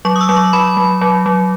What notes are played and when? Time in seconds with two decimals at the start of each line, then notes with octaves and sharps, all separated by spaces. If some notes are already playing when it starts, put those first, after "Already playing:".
0.05 F#3 C#6
0.16 D#6
0.21 E6
0.29 F#3
0.37 C#6
0.53 F#3 B5
0.77 F#3
1.01 F#3
1.26 F#3